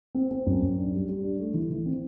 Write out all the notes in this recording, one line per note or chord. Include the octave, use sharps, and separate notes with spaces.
C4
C4
F#2
F#2
D4
G3
G3
D4
A3
E3
E3
C4